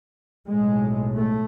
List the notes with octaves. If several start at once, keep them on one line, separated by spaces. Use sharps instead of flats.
B1 A2 G#3
A3